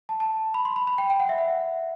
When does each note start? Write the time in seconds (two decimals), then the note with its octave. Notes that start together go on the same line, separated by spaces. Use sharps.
0.09 A5
0.20 A5
0.54 B5
0.65 C6
0.76 B5
0.87 B5
0.98 G5
1.10 G5
1.20 F#5
1.29 E5
1.38 F#5